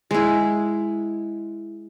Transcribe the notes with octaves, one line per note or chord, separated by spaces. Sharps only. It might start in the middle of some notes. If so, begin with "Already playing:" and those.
G#3 E4